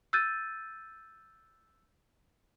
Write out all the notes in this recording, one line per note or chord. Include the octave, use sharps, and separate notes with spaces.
E6 F#6 G6 A6 D#7